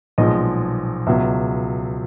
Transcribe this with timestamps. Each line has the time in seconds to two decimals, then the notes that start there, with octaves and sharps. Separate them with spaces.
0.18 B1 A#2 F3 G#3 D#5
1.07 C#2 B2 F#3 E5